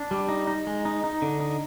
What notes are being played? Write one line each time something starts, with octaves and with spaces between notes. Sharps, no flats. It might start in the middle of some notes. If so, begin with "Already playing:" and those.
Already playing: D4
G3
D#4
D#4
G#3
D#4
D#4
D3
D#4